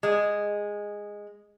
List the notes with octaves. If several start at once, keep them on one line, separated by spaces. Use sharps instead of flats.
G#3